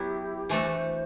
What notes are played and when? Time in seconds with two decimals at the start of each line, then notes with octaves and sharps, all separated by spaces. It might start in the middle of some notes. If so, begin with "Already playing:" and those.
Already playing: F#3 B3 E4 G4
0.49 E3 A3 D4 F#4 A4 C5